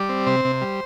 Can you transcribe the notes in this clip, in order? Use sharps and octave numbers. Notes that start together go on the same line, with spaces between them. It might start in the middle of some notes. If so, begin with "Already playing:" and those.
Already playing: G3 D5
C4
C3 C5
C3
G3